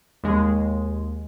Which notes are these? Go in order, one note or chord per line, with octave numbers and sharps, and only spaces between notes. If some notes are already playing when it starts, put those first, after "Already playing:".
D#2 G#3